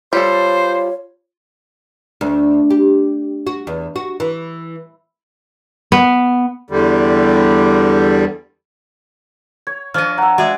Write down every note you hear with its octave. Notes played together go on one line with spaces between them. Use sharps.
G3 F4 A4 C5 C#5
D2
G4
F#4
E2
F#4
E3
B3
E2 D3 G3
C#5 G#6
F3 D4 C#5 D#5 F6
F#5 A#5 E6
G#3 F#4 G#4 D5 E5